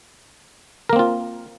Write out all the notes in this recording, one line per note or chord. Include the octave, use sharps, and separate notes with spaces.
A#3 C4 F4 A#4